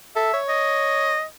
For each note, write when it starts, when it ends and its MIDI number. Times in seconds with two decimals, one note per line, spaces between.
0.16 0.30 69
0.16 0.39 76
0.34 1.16 73
0.49 1.24 75